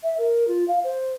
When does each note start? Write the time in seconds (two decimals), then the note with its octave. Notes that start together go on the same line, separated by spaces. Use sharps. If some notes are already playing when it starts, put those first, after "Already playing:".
0.03 E5
0.18 A#4
0.47 F4
0.68 F5
0.84 C5